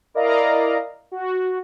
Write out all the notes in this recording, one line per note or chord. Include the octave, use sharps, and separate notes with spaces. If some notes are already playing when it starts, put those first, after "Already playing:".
E4 A#4 D5 D#5 F5 A#5
F#4